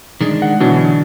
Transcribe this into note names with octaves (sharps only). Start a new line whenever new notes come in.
D#3 G#3 D4
F#5
B2 D3 E3 F#3 D4